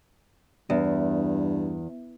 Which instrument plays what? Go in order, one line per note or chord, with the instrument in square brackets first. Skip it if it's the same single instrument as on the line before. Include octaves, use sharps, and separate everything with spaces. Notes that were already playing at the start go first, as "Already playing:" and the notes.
[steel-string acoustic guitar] E2 [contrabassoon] G2